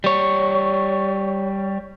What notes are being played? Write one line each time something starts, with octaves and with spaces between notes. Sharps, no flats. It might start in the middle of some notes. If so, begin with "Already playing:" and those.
G3 C#5